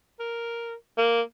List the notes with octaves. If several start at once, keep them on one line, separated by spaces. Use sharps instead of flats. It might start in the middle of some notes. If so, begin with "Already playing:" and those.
A#4
A#3